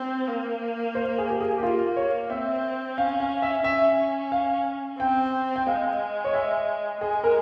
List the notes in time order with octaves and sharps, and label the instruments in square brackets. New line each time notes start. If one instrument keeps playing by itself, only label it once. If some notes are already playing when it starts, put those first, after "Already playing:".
Already playing: [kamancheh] C4
A#3
[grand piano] C5
G#4
G4
G#4
G4
[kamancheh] A#3 [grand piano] F4
[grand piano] C#5
[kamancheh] C4 [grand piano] E5
[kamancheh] C#4 [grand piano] F5
[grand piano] F5
E5
[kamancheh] C#4 [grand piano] E5
[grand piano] F5
[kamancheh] C4 [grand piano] G5
[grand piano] G5
[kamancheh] G#3 [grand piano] F5
[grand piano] C#5
E5
[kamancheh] G#3 [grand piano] G#4
[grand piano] A#4